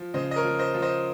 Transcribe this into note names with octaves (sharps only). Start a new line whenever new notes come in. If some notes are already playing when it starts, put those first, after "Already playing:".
Already playing: F3
C#3 C5 D#5
D#5
A#4 C#5
F3
C5 D#5
F3
C5 D#5